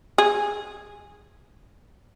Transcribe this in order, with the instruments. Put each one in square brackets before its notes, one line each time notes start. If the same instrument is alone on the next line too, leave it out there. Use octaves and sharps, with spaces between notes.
[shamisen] G#4